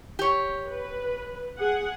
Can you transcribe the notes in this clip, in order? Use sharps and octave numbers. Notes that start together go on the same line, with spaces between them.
G4 C#5
B4
G#4 F#5